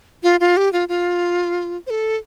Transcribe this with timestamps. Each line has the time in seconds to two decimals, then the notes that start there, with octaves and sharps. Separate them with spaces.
0.23 F4
0.40 F4
0.57 G4
0.73 F4
0.89 F4
1.87 C5
1.90 A4